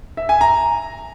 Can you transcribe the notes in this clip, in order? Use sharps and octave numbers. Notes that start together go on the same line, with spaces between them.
E5
G#5
A#5